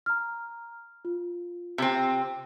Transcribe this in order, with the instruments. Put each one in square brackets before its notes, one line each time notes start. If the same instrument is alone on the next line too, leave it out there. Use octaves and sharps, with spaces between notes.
[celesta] A#5 F6
F4
[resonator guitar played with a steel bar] C3 C4